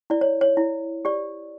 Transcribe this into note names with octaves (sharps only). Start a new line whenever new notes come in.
E4 D5
C#5
C#5
E4
G4 D5